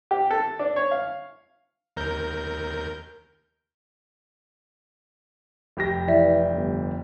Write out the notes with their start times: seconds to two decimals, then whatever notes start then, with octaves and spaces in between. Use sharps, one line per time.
0.11 G4
0.31 A4
0.59 D4
0.76 C#5
0.91 F5
1.97 D#2 A#4 G6
5.77 F1 G4 A#6
6.08 E3 D5 E5
6.52 G1